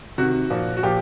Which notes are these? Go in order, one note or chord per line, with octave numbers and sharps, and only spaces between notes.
C3 D#3 F#4
A#2 F3
F#4
A#2 F3 G4